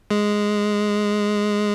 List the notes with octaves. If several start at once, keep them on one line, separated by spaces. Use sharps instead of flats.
G#3